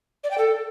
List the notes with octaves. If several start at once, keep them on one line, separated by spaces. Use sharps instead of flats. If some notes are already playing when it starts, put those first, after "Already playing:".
D5
G5
A4